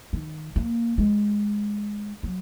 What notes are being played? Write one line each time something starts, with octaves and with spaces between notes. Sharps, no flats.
D#3
A#3
G#3
F#3